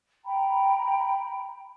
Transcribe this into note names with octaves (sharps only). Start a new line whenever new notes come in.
G5 A#5 B5